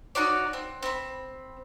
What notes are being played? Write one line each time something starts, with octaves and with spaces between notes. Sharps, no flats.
D#4 F#4 C#5 D5
C4
C4 B5